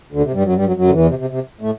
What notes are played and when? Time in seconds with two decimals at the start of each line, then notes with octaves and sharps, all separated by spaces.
0.12 D2 D3
0.23 C3
0.33 G2 G3
0.45 F#2 F#3
0.55 G2 G3
0.66 F#2 F#3
0.76 F#2 F#3
0.88 D3
0.92 E2 E3
1.08 C3
1.19 C3
1.30 C3
1.61 A2 A3